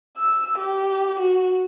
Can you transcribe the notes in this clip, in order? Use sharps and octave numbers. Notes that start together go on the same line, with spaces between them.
E6
G4
F#4